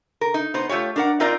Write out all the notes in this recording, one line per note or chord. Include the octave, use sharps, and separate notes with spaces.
A#4
D#4
B3 D#4 C5
A3 F4 G4 C#5
D4 A#4 F#5
C4 D#4 F4 A#4 D5 D#5